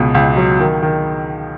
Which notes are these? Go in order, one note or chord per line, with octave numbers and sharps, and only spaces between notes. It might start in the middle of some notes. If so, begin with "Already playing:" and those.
Already playing: C#2 B2
C#2
F#3
D#3
D#3